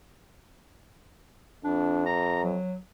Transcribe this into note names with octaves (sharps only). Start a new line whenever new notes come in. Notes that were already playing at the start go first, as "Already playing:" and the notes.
F2 D4
A#5
F#3